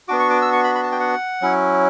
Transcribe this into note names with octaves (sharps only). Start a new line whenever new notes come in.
B3 D4 F#4 D6
C#6
D6
E6
C#6
B5
B5
A5
G5
F#5
F#3 C#4 E4